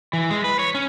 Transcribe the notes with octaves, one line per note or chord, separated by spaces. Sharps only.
E3
G#3
B4
C#5
C#4